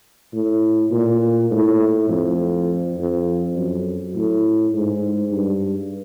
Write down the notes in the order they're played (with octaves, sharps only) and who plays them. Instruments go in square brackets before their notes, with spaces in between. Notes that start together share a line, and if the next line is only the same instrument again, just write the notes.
[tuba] A2
A#2
A2
F2
F2
F#2
A2
G#2
G2